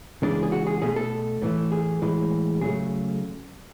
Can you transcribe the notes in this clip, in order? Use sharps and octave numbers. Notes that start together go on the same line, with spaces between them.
C#3 E3 G#3 D4
G#4
F#4
G#4
B2 A3 G#4
A4
A2 E3 A3
G#4
A2 E3 G#3
C#3 F#3 A3 G#4